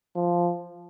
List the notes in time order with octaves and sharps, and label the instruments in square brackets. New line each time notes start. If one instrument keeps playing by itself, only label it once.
[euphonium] F3